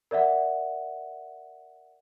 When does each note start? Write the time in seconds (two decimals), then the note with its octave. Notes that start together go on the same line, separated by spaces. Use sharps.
0.11 A#4 D5 E5 F#5